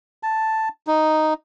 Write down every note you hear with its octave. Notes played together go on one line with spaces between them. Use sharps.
A5
D#4